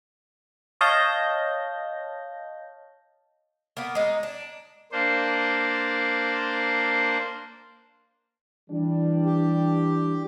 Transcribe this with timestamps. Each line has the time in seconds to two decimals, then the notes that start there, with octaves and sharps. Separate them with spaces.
0.81 C#5 D#5 F5 A5 G6 A#6
3.77 A#3 B3
3.95 G#3 D#4
4.23 D4
4.92 A#3 D4 C5
8.70 E3 G3 D4
9.25 G4